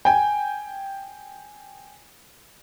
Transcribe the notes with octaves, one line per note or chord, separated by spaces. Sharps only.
G5 G#5